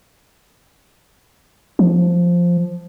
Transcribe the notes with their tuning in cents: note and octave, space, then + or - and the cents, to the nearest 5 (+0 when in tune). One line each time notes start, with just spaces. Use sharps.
F3 +0